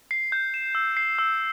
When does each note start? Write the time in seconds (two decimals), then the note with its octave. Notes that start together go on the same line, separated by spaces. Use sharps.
0.11 C7
0.32 G6
0.54 E7
0.75 E6
0.97 C7
1.18 E6